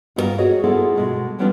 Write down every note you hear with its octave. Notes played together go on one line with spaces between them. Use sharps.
G2 B3 E4 F4 A#4
F#4 G#4 C#5 D#5
B3 E4 F4 G#4 A4
B2 G#3 A3
E3 G3 B3 C#4 D4 F4